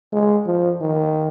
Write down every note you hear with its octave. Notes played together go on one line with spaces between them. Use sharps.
G#3
F3
D#3